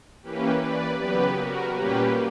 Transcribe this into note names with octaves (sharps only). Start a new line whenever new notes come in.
E3 A#3 C#4 G4 B4
B4 D5
C#3 F#3 B3 G4 B4
F#4 A#4
A#2 G3 A#3 C#4 G4 B4